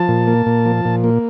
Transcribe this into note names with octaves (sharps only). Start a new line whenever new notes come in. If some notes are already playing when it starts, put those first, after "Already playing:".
Already playing: F3 A5
A#2
A#3
A#2
F3
A#2
A#3